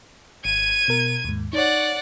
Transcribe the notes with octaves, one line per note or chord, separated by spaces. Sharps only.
G#1 G#6 D#7
B2 A#4
D#2 G#2
D#4 C#5 D5 F#5